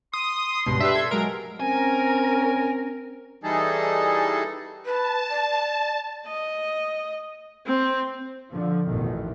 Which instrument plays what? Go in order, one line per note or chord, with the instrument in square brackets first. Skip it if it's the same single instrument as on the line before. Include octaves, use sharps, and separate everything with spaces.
[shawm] C6 [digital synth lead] D#6
[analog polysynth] C#2 G2 B2
[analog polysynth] D4 G4 B4 [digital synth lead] E5
[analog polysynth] A4 G#6
[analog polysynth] F#3 G#3 D7 [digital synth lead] A#4
[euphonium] C4 [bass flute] C#4 [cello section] A#4 [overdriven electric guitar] G#5
[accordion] E3 G3 D#4 G#4 A4
[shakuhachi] B4 [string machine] A5
[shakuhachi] D5
[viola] D#5
C4
[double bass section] D3 F3
A1 F2 B2 D#3 A3